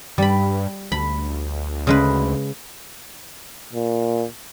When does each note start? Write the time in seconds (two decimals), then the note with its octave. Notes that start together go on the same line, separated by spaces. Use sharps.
0.18 G2 G3 B5
0.92 D2 B5
1.87 C#3 G#3 B4
3.73 A#2